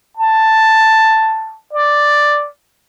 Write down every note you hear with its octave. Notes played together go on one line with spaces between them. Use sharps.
A5
D5